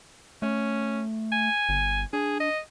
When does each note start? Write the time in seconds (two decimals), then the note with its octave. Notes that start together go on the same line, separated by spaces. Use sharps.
0.42 A3 C#4
1.32 G#5
1.69 G1
2.13 D4 G#4
2.40 D#5